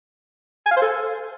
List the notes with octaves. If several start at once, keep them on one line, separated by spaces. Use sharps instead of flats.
G#5
F5
C5
A4